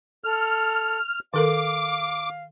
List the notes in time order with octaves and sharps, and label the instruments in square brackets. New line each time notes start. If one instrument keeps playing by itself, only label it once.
[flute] A4 [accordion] F6
[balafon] D#3 A4 A#4 [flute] F5 [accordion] D6